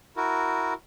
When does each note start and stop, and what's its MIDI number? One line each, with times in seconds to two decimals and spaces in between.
0.17 0.74 64
0.17 0.74 66
0.17 0.74 70